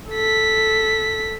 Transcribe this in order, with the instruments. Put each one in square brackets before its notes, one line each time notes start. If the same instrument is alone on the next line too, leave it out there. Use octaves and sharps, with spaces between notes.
[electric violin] A4 B6